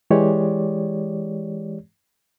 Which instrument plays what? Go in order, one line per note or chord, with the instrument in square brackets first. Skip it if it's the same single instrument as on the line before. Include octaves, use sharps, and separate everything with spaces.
[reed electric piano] E3 G#3 G4 C#5 D5